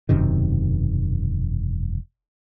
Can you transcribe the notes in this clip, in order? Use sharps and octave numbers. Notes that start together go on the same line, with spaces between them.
E1 F#2 C3 D#3